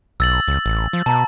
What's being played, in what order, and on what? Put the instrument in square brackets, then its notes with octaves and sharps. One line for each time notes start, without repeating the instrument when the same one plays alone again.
[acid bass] B1 [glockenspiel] E6 A6 F#7
[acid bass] C#2
A1
F3
[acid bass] B2 [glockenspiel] A5 A#5